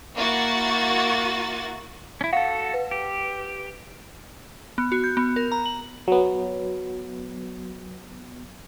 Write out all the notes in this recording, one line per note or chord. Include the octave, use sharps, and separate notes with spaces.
A#3 E4 F#4 A6
C#4 E4
F#4 A4 F5 F#5
B4
G4
B3
F#4
G6
B3
A#4
A#5
F#7
F#3 B3